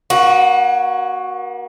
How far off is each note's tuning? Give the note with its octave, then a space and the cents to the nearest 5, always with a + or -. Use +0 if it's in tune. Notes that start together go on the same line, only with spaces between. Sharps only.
A#3 +35 F#4 +0